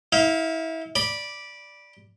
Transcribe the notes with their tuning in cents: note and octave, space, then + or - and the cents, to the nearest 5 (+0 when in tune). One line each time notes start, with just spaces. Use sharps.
E4 -30 F5 +0
D5 +0 B5 -15